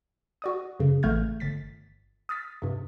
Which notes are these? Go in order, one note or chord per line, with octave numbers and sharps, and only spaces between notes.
F#4 D5 D#6
F#2 C#3
A1 A3 F6 G6 G#6
G1 A6 B6
D#6 F6 A6 B6
G2 C3